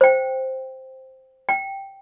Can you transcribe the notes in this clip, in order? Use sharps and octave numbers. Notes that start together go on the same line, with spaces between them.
C5 G5
G5